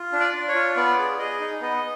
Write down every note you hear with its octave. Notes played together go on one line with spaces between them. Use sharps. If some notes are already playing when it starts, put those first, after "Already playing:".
Already playing: F4
D4
D5
D4
C#5
F4
B3 D5
G#4
G#4 D#5
D#4
B3 D#5